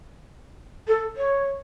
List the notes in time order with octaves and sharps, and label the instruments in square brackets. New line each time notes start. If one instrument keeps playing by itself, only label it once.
[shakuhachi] A4
C#5